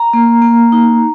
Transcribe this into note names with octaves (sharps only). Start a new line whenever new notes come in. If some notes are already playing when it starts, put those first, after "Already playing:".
Already playing: A#5
A#3
A#3
D#4